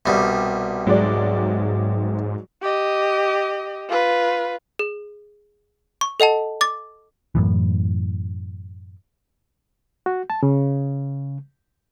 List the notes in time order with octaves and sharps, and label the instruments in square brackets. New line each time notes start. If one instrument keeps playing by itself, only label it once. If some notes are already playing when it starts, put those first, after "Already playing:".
[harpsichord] C2 B2 G3
[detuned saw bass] G#2 [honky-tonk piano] F#3 G#3 D5
[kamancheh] G4 D#5
F4 B4
[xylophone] G#4
C#6
A4 D#5 F#5 A5
D6 A6
[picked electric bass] F#2 A2 E3
[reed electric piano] F#4
A5
C#3